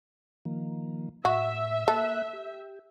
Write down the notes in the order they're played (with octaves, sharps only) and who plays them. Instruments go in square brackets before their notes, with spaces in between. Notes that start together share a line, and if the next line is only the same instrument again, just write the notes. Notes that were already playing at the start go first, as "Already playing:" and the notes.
[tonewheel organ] D#3 F3 A#3
[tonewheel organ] A2 [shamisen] F#4 [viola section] E5
[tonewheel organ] A#3 F#6 [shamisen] A4
[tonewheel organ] G4